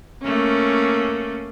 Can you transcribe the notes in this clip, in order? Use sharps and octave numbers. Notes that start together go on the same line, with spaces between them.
A3 A#3 C#4